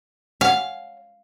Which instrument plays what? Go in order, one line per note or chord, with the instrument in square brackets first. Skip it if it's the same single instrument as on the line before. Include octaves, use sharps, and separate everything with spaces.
[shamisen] C#5 F#5 G#5 [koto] F5